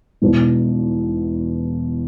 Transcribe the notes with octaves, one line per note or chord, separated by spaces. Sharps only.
E1 E2 B2